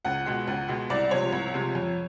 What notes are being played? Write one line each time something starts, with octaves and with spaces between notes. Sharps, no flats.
C#2 F#5
B2 G#3
C#2
B2 G#3
C2 D5
C3 F3 G#3 C#5
C2
C3 F3 G#3
F2